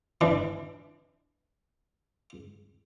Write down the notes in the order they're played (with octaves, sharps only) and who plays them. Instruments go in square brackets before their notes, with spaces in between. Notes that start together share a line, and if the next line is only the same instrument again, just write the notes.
[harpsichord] E3 D4